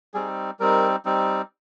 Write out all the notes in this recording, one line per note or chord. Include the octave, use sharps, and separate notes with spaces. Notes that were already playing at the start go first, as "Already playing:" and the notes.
G3 C4 D#4 G#4
G3 C4 D#4 A#4
G3 C4 D#4